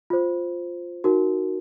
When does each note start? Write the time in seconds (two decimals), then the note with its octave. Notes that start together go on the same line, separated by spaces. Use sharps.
0.10 F4 C5
1.04 D#4 F#4 A#4